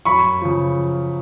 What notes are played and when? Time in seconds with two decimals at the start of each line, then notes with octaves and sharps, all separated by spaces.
0.05 F#2 B5 C#6
0.42 C#3 F3